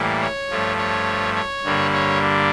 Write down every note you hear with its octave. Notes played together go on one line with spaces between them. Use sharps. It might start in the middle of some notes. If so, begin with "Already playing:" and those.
Already playing: A2 E3 G3 A#3
C#5
G2 F3 A3
C#5
C#5
G2 D3 G3 A#3
C#5
D4